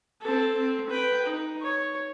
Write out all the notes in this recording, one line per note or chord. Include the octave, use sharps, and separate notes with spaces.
C4 A4
C4
B4 G5
D#4
C#5